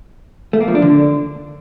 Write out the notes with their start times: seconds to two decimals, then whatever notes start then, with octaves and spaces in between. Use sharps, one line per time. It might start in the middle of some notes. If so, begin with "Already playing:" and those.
0.53 A3
0.61 A#3
0.68 F3
0.75 D4
0.82 D3